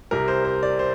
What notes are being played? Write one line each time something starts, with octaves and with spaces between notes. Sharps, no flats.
C2 C3 G3 A#4
C5
C5
D5
C5